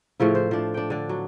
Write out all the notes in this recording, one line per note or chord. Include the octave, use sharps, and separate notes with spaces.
A2 C#3 F3 E4
C5
F3 D4
D4 G5
D3 D4
F#3